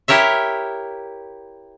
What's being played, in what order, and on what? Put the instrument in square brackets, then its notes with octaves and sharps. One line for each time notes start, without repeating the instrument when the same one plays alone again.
[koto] E4 G4 A#4 C#5 E5